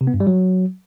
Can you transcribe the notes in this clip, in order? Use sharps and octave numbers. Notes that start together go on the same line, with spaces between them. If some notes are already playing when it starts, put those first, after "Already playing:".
C3
B3
G2
G3
F#3